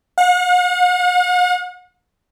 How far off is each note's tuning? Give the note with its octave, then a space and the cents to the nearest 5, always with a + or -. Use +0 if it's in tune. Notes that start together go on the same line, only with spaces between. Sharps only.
F#5 -45